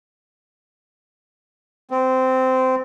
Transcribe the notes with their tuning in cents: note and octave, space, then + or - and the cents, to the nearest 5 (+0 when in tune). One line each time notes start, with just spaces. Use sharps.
C4 -15